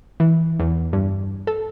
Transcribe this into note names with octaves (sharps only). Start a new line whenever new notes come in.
E3
E2
G2
A4